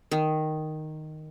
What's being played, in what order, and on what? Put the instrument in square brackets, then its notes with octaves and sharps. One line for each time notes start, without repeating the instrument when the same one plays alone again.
[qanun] D#3